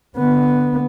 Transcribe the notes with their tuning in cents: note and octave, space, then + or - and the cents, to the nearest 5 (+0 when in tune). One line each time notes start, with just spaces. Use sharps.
D3 +0 B3 +0